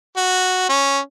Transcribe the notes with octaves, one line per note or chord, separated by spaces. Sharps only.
F#4
C#4